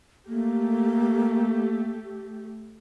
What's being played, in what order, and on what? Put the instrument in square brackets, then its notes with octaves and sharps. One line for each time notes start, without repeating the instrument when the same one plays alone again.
[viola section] A3 G4 [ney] A#3